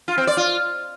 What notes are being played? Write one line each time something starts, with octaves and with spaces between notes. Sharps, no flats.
F4
C4
D5
F4